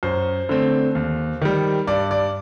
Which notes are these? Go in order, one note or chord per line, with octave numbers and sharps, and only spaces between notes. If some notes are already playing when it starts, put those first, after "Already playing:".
F#2 C5
D3 A3 C4
D#2
D#3 G3
G2 D5
D5